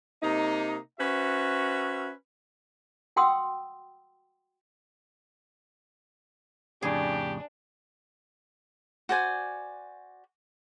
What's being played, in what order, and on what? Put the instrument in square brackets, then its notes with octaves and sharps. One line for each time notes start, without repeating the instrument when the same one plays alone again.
[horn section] C3 A#3 D#4
C#4 F#4 B4 C5 E5
[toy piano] F#4 F#5 G5 C6 D#6 E6
[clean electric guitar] F2 A2 C#3 [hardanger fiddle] D4 [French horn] G4 [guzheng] G#4
[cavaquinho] F#4 C5 D5 G#5